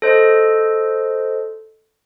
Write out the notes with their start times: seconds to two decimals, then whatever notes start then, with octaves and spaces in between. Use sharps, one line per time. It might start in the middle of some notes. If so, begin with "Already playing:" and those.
0.02 A4 C5 D#5